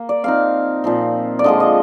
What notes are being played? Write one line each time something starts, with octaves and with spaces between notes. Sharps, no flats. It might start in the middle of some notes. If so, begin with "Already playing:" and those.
Already playing: A#3
D5
F3 C4 D#4 F5
A#2 F3 C4
D5
D3 F3 G#3 D#5
D#5